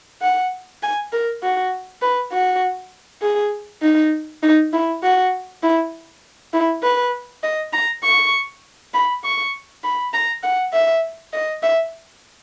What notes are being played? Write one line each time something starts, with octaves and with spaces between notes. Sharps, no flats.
F#5
G#5
A#4
F#4
B4
F#4
G#4
D#4
D#4
E4
F#4
E4
E4
B4
D#5
A#5
C#6
B5
C#6
B5
A#5
F#5
E5
D#5
E5